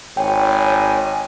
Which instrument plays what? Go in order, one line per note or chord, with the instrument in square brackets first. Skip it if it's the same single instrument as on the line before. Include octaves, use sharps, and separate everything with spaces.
[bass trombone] G#1 [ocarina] C#5 [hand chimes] G5 [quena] G#5